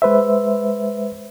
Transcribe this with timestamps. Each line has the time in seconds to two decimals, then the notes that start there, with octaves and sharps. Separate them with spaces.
0.02 G#3 B4 C5 E5